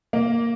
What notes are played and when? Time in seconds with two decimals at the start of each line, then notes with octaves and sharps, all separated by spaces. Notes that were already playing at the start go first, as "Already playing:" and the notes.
0.13 A#3